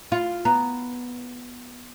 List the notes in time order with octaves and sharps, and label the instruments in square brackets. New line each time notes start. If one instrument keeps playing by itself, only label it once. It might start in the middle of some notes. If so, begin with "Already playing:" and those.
[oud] F4
[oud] B3 [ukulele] A#5